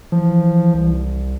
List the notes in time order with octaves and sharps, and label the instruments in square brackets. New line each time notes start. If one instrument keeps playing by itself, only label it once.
[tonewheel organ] E3 [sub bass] F3
[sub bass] C2